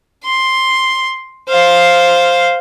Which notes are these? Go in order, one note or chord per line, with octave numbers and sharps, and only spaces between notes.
C6
C5 F5